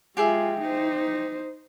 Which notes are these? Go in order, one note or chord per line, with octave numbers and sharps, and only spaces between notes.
G#3 F4 G4 G#4 E5
D#4 C5